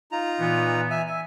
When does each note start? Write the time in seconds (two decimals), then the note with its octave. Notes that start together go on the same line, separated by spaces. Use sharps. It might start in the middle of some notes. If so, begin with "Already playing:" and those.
0.12 D#4 F4 A#5
0.39 A#2 E3 B3
0.90 E5 G#5
1.07 E5 G#5